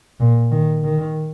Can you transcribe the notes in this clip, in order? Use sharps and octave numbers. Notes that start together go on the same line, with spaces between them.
A#2
D#3
D#3